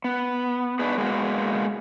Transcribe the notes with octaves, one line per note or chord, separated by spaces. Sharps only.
B3
D4 D#4 F#4 G#4 B4
G#3 A#3 B3 F#4 G#4